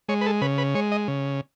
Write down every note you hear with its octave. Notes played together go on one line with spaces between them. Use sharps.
G#3 C#5
B4
A4
C#3 B4
B4
G#3 C#5
D#5
C#3